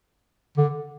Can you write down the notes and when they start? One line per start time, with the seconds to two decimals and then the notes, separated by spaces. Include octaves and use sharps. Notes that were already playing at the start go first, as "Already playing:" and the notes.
0.57 D3